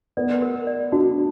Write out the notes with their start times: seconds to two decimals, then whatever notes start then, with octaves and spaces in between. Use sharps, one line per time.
0.17 B3 D5
0.42 A#4
0.67 D5
0.92 D4 F#4